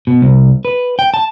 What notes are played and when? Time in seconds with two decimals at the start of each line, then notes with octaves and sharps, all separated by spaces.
0.07 B2
0.22 C2
0.65 B4
0.99 G5
1.14 A5